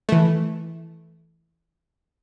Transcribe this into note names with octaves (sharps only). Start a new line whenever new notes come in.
E3 A3